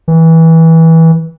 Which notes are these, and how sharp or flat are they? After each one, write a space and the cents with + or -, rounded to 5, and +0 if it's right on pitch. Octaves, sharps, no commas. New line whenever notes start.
E3 -20